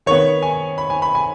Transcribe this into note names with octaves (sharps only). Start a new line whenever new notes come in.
D#3 B3 C#5
G#5
B5
G#5
B5
G#5